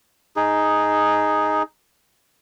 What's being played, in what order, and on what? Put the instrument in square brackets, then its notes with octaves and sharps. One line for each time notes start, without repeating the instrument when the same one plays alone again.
[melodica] D#4 G#4